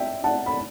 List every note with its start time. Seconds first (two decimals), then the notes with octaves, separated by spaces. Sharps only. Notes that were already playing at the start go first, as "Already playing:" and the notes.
Already playing: E5 G5
0.24 F#5 A5
0.46 B5